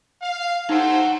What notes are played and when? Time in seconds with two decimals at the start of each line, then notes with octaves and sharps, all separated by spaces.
0.21 F5
0.69 D#4 G4 A4 C5 F#5 A#5